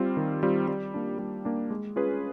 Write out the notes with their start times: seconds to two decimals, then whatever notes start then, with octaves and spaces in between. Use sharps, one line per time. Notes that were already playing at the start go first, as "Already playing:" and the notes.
Already playing: G3 C4 F4
0.17 D#3
0.43 G3 C4 F4
0.68 G3
0.94 A#3 D4
1.19 G3
1.45 A#3 D4
1.70 G#3
1.96 C#4 F4 G#4 B4